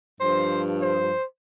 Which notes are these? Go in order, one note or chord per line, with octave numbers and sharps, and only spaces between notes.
G2 F3 C5
C5